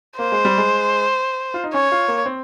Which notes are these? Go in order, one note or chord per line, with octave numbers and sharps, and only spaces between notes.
A#3 C5
G#3
G3
G#3
F4
D#4
C#4 C#5
F4
A#3
C4